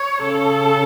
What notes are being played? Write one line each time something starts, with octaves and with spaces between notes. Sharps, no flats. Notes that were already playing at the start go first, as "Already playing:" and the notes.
Already playing: C#5
C#3 A4